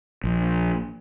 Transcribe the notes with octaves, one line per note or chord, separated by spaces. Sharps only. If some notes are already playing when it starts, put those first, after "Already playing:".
A#1